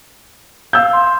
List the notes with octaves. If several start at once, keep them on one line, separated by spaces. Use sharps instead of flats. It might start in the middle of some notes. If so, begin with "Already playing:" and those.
F5 E6 G6
C6